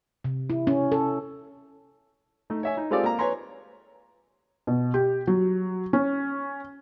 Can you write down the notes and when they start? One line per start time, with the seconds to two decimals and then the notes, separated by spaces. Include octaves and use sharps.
0.25 C3
0.50 E4
0.67 C#4
0.92 A4
2.50 A3 D#4
2.63 C#5 E5 G#5
2.77 D#4
2.91 G#3 C4 F4 G4 A4 D5
3.04 A#3 A#5
3.19 B4 C#5 G#5 A#5 C6
4.67 B2
4.94 G4
5.27 F#3
5.93 C#4